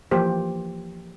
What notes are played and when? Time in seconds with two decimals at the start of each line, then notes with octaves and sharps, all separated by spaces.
0.11 E3 F3 A#3 G4 C5